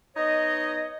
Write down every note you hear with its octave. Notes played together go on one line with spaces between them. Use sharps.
B3 D#4 C#5 D#5